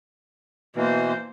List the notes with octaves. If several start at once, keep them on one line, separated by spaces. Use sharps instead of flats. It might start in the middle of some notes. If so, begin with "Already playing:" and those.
B2 E3 A#3 C5